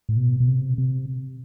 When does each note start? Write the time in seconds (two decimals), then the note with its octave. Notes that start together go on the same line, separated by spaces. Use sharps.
0.09 A2
0.17 B2
0.40 B2
0.48 C3
0.78 C3